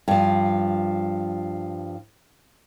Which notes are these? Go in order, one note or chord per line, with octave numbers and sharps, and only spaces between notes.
G2 F3